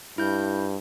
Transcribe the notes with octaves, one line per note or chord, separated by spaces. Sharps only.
G2 E4 G6